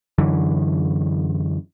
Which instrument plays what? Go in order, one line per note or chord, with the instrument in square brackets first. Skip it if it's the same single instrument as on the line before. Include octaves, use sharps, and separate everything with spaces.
[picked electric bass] F#2 D3 E3